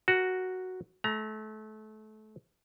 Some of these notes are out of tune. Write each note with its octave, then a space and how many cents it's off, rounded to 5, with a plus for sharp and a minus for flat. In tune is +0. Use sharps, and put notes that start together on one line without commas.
F#4 +0 A#4 +0
A3 -30 A#5 +20